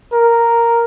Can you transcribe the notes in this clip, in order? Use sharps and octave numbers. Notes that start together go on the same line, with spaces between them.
A#4